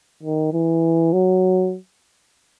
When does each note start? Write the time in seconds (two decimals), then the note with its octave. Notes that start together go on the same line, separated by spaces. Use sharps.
0.23 D#3
0.53 E3
1.13 F#3